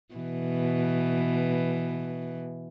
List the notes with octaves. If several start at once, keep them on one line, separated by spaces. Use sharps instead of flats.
B2 E3